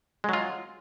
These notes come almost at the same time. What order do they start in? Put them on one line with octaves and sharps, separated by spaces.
G#3 F#3 F4